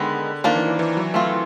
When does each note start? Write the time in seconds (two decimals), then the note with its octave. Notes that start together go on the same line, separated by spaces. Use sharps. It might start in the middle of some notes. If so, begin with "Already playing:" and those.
Already playing: D3 D#3 G#3 B3
0.44 D#3 F3 A#3 D4
0.56 E3
0.68 E3
0.79 E3
0.97 F#3
1.14 A3 C4 F4